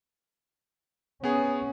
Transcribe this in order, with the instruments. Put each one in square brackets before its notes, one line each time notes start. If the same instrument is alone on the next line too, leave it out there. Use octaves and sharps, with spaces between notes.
[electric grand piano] B3 G#4 [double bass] C#4